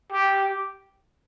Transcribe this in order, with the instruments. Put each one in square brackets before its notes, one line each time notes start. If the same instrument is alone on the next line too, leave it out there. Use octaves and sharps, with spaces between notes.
[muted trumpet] G4